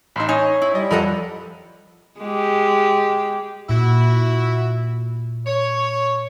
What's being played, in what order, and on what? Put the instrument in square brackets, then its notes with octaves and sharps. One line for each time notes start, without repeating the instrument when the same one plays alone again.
[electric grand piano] A1 D#4 [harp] B5 C6 E6
[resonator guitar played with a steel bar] D#4 [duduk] C#5 [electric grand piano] G#5
[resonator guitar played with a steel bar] E4
[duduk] G3 [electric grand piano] D5 D#5
[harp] F2 F3 [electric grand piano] A4 B5 [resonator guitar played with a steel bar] A#4 D#5 F#5
[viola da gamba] G#3 G4
[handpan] A#2 [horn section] E4 F#4
[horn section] C#5